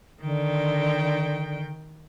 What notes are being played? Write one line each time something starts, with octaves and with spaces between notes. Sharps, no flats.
D3 D#3 G5